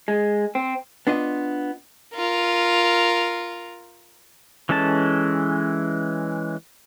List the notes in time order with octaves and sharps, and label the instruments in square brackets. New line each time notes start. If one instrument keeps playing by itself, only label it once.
[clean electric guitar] G#3
C4
[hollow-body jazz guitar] B3 D4 F4 D#5
[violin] F4 A#4
[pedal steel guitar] E3 G#3 C#4 A4 A5